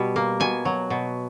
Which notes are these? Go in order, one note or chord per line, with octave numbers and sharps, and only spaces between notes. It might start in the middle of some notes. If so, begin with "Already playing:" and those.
Already playing: B2 G3
A#3
B2 G#5
F#3
B2